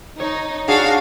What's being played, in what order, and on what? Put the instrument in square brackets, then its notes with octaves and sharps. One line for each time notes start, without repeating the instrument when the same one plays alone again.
[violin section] D#4 [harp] C#5
[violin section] D4 F#4 F5 [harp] G#4